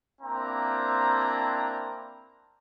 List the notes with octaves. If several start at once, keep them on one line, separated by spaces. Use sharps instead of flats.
A#3 C4 D4 E4 A#5